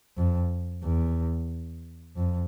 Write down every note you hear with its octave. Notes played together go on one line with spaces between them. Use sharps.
F2
E2
F2